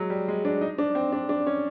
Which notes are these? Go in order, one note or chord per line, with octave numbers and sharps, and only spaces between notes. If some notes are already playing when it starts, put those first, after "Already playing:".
Already playing: F#3 G#3
G3
G#3
D4
D#4
D4
C4
D4
D4
C#4